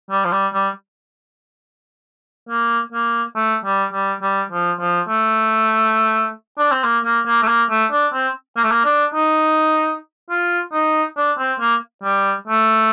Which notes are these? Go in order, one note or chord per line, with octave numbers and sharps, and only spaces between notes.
G3
F3
G3
G3
A#3
A#3
A3
G3
G3
G3
F3
F3
A3
D4
C4
A#3
A#3
A#3
A3
A#3
A3
D4
C4
A#3
A3
A#3
D4
D#4
F4
D#4
D4
C4
A#3
G3
A3